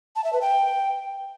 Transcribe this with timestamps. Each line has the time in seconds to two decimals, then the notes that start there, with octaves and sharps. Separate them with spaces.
0.16 A5
0.24 E5
0.33 B4
0.41 G5